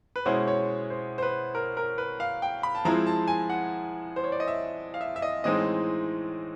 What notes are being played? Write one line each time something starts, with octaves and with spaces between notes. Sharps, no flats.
B4
B2 G#3 C#4 E4 C5
C#5
C5
C5
B4
A#4
A#4
B4
F5
G5
B5
A5
F3 G#3 C4 E4 A#5
A5
G#5
F#5
C5
C#5
D5
D#5
E5
F5
E5
E5
D#5
A2 E3 G#3 C4 D#4 D#5